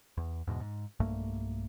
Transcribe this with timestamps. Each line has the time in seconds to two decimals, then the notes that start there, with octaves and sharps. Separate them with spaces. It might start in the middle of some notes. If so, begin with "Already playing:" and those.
0.17 E2
0.47 E2 G#2 B2
0.60 G#2
1.00 B1 G2 A3 A#3